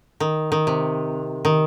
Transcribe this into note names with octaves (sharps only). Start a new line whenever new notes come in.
D#3
D#3
C3
D#3